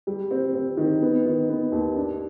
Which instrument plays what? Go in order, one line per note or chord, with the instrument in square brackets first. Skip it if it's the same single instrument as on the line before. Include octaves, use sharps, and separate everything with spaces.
[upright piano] G3
C4
C4
D#3
B3
D#3
B3
D#2
D4